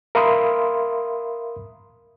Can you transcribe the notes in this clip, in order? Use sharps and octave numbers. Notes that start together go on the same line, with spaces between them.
A#4 E5 F5 B5 C6 D#6